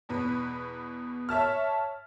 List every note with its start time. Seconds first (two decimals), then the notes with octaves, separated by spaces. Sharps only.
0.09 E2 B2 B4
1.29 C#5 E5 A5 F6